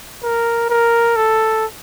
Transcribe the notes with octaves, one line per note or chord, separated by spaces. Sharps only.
A#4
A#4
A4